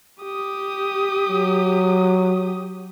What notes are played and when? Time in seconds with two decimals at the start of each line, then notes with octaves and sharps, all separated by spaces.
0.23 G4 D#6
1.29 F#3